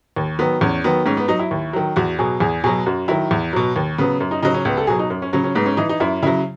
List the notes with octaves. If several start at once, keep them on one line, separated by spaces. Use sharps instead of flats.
D#2
D#3 F#3 B3
E2 C#4
D#3 F#3 B3
G#2 C#4
B3
F#3 D#4
E4
D#2
D#3 F#3
E2 F#4
B2 F#3 G#4
E2 G#4
B2 F#3 G#4
F#2 F#4
D#3 F#3 E4
E2
B2 F#3
D#2
C#3 F#3 B3
F#2
D#4
C#3 F#3 D#4
C#4
C#2 B3
A4
B2 F#3 G#4
D#4
F#2
C#4
C#3 F#3 C#4
C#4
G#2 B3
C#4
E3 D#4
D#4
F#2 E4
C#3 F#3 E4